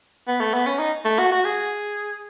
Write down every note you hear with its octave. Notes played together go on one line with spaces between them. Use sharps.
B3
A3
B3
C#4
D#4
A3
F#4
F#4
G#4